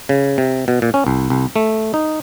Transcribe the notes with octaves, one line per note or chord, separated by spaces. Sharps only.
C#3
C3
B2
A#2
C#4
C2
C2
A3
D#4